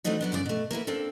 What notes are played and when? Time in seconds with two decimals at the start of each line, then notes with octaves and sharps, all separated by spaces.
0.04 E3 A3 C4 D4 D#4 F#4
0.21 F#3 B3 D4
0.32 G2 C#3 E4 D5
0.46 B2 A3
0.71 A#3 B3 E4 B4
0.87 A#3 C4 D4 A4